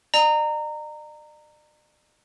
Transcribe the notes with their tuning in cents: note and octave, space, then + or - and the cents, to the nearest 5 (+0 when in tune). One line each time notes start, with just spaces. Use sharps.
D5 +45 A#5 -20